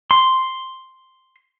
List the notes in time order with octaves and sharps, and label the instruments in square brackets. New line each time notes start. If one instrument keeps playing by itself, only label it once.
[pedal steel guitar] C6